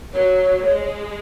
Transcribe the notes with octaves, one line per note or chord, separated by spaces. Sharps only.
F#3 C#5
G#3